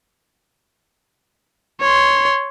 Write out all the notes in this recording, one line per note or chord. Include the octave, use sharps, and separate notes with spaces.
C#5 C6